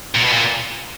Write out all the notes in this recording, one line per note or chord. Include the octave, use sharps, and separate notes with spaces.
A#2
B2
A#2